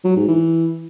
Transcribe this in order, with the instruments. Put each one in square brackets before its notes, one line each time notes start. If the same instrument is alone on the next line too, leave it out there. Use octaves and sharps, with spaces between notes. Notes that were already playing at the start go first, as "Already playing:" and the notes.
[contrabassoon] F#3
G#2
E3